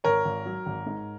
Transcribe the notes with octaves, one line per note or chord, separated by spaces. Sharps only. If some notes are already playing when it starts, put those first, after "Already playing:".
G#1 A#4 C#5
G#1
F#3
G#1
G#2